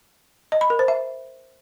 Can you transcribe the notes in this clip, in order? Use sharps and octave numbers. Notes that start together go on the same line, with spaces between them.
D#5
B5
A#4
C5
E5